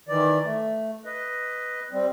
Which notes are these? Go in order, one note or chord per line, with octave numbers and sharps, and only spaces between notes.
D#3 E3 D5
A3
B4 D#5
G3 C4